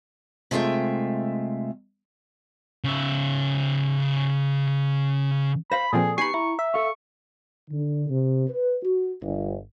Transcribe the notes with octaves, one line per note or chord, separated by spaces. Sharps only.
C3 G#3 A3 F4 E5 G5
C#3 E5
C5 F5 B5 A#6
A#2 F3 C4 G#4 A4 D5
B3 D#4 G4 G#5 B5 C#6 C7
E4 A#5
E5
A4 F5 C#6
D3
C3
B4
F#4
G1